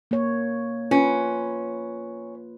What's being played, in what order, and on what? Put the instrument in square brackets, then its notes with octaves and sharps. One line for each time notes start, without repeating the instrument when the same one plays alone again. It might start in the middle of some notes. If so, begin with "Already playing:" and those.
[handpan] A#3 C#5
[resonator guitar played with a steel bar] C#4 [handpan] F4 B4